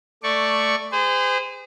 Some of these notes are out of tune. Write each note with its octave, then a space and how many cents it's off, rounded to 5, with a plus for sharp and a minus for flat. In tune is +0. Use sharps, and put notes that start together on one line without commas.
A3 +5 D5 +0 C#6 +0
G#4 -30 C5 -35